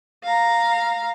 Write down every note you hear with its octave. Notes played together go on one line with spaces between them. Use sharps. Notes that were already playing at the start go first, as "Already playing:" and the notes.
F5 A#5